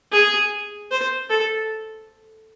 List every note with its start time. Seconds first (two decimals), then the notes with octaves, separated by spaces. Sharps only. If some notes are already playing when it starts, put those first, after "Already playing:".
0.12 G#4
0.91 C5
1.30 A4